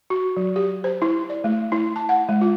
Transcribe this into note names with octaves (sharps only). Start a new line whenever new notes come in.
F#4
F#3
G4
C5
E4
D5
A3
E4
A5
F#5
G#3
F4